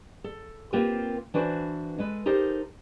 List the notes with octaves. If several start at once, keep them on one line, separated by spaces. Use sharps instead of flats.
A4
A#3 C4 F4 G4 A#4 B4
E3 D4 F#4 B4 C5
G#3 A4 B4
D#4 G4 A4 A#4 C5